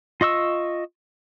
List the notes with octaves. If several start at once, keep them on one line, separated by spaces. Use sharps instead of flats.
F4 D#5 C#6 E6